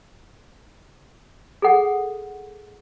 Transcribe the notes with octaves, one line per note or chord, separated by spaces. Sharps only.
G#4 A4 F#5